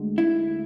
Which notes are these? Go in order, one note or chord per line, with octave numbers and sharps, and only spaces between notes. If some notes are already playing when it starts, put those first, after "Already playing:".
Already playing: D2 D3 G#3
E4